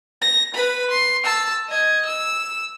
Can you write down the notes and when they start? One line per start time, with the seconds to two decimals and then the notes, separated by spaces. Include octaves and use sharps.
0.22 A#6
0.55 B4 B5
0.91 C6
1.24 A5 E6
1.69 D#5 G#6
2.06 E6